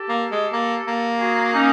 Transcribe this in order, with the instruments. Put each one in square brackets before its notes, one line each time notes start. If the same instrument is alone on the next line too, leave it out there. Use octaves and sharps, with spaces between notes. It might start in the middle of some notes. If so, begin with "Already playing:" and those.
Already playing: [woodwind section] G4 A4
[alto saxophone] A#3
G#3
A#3
A#3
[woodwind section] F#4 G#4
C#4 D#4